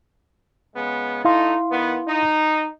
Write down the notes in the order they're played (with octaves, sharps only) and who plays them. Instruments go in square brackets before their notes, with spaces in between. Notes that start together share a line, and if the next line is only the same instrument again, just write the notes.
[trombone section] C#3 G#3 B3
[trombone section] A3 D#4 [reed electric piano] E4 F5 C6
[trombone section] D#3 B3
D#4